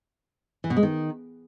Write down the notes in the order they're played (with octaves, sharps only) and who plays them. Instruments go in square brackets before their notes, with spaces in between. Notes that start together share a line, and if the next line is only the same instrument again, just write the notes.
[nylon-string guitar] E3
B2
G#3
D#3